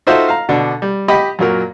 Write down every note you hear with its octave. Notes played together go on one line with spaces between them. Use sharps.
D#4 F4 F#4 A4 C5 E5
F5 A#5
B2 D3 D4
G3
G4 D#5 B5
F#2 A#2 F#3 A#4